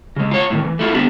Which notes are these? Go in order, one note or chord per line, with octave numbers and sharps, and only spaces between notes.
C#3 G#3
F4 C#5
A2 C3 D#3
E3
A3 E4 F4
B3 D4 G4